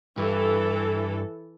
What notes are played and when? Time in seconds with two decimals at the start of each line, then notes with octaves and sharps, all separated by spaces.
0.18 G2 E3 A4